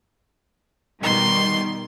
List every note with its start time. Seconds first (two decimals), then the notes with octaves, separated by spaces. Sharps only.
1.03 B2 D#3 G3 C6